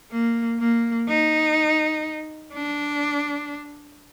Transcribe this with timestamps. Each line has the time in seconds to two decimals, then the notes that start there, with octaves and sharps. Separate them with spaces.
0.12 A#3
0.60 A#3
1.09 D#4
2.53 D4